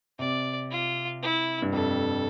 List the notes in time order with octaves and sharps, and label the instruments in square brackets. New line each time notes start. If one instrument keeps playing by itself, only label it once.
[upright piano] C3 [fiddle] D5
[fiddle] F4
E4
[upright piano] G2
[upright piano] F2 [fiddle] A4